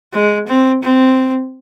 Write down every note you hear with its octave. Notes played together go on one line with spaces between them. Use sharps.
G#3
C4
C4